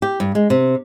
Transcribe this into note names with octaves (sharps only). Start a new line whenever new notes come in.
G4
G2
G#3
C3